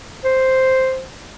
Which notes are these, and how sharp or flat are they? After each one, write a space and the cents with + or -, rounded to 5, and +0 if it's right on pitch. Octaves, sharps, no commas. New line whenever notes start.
C5 +0